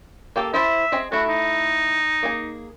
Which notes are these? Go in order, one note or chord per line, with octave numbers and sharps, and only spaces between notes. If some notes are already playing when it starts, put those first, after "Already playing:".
A#3 G4 A4
E4 C5 E5 A5
C4 G#4 D#5
A3 E4 F#4
D#4
A#3 G#4